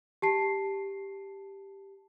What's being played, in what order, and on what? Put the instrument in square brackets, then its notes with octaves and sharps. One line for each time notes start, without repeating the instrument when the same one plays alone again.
[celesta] G4 A5 C7